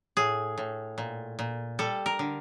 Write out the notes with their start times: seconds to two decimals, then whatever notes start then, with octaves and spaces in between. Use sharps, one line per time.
0.17 A2 G#4
0.58 A2
0.98 A#2
1.39 A#2
1.79 G3 A4
2.06 A#4
2.19 D3